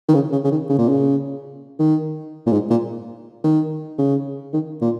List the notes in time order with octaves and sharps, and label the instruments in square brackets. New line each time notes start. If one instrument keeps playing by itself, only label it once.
[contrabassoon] D#3
C#3
C#3
C#3
D#3
C#3
A#2
C#3
D#3
A#2
G#2
A#2
D#3
C#3
D#3
A#2